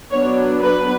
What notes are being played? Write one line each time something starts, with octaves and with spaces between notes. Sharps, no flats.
F#3 B3 D4 C#5
B4